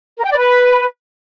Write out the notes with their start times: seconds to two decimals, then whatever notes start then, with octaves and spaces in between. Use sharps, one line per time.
0.18 A#4
0.24 G5
0.31 D5
0.37 B4